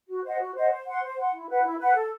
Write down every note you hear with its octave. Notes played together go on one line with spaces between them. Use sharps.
F#4
C5 D#5 F#5
F#4
C5 D#5 F#5
C5
F#5 C6
C5
F#5 C6
E4
B4 F#5
E4
B4 F#5
A4